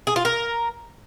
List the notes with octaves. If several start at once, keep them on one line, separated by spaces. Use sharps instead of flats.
G#4
F4
A#4